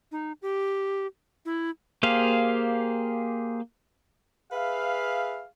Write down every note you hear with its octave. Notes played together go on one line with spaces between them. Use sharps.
D#4
G4
E4
A#3 G4 G#4 C5 F5
G#4 B4 E5 F5